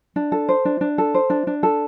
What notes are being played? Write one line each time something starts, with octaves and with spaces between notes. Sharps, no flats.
D4
A4
C5
D4
D4
A4
C5
D4
D4
A4